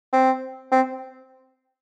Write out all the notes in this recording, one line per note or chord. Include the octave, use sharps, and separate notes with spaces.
C4
C4